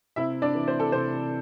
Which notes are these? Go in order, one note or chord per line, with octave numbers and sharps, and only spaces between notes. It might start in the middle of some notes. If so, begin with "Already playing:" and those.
C3 E4 E5
D4 D5
E3
C5
A4
C3 C5